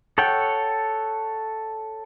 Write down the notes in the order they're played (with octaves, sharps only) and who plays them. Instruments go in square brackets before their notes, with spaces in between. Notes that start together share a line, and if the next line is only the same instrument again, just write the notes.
[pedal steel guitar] A4 C#5 F#5 G5